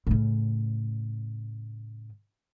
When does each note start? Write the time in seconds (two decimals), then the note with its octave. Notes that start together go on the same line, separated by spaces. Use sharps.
0.07 A2 C#3